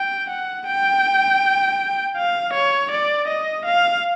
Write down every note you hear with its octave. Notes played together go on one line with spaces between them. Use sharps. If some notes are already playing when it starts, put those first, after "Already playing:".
Already playing: G5
F#5
G5
F5
C#5
D5
D#5
F5